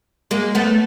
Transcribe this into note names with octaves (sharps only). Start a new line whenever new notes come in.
G#3 A#3
A3 B3